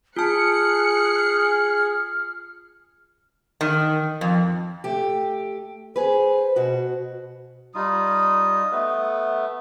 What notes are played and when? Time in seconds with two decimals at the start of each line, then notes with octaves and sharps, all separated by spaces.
0.17 F4 G#4 A5 F6 F#6 C#7
3.61 D#3
4.21 F2
4.84 A3 G4
5.96 G#4 B4 C5
6.56 B2 F#4
7.75 G3 D#4 F4 D#6
8.72 A3 B3 B4